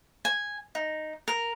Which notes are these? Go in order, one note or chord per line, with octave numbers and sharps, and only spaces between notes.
G#5
D#4
A#4